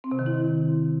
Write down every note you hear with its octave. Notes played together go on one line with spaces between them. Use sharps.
C4
C3
D#3
E4